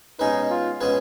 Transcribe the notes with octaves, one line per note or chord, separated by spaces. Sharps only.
B2 G#3 C#4 D#4 G#4 B4
F4
B2 G#3 C#4 G#4 B4